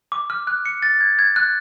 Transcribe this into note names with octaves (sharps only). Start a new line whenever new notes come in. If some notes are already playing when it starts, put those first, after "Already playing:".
D6
F6
F#6
C#7
A6
G#6
G#6
F#6